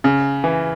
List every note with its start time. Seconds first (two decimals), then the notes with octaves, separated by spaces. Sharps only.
0.04 C#3
0.44 E3